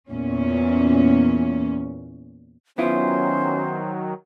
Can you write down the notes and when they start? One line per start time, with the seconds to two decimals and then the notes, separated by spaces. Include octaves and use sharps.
0.10 E2 A#2 C#4
2.78 D#3 F#3 B3 C#4 E4 F4 C5